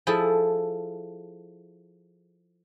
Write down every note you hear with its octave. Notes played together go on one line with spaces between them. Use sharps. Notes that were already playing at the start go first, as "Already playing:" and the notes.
F3 E4 G#4 A4